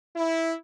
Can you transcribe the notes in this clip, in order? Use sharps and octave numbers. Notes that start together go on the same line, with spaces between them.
E4